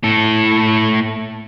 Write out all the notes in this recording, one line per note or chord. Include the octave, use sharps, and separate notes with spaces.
A2 A4